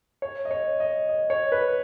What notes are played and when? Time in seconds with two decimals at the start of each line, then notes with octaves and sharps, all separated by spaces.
0.22 C#5
0.45 D#5
0.51 C#5
0.80 D#5
1.09 D#5
1.30 C#5
1.52 B4